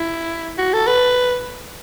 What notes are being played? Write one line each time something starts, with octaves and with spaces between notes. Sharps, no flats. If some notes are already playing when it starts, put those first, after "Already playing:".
Already playing: E4
F#4
A4
B4